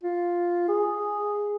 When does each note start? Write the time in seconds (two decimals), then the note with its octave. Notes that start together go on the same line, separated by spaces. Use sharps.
0.04 F4
0.68 G#4